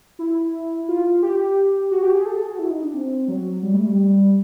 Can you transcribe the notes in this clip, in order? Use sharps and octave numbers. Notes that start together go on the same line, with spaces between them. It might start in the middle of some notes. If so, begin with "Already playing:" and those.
E4
F4
G4
F#4
G4
G#4
A4
G#4
F#4
E4
D#4
D4
C4
F#3
G3
A3
G3